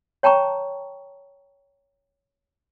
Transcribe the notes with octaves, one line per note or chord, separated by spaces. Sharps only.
C#5 G5 A5 A#5 C#6